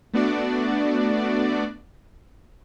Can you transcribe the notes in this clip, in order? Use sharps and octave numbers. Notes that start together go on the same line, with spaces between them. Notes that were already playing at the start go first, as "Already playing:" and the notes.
A3 B3 D4 F#4 D5